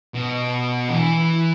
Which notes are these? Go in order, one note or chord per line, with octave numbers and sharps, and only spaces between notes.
B2
E3